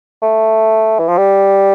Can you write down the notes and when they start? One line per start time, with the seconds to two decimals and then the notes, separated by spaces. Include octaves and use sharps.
0.22 A3
0.99 E3
1.08 F3
1.18 G3